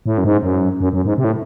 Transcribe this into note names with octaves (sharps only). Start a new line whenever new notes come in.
A2
F#2
G#2
F#2
F#2
F#2
G#2
C3
A2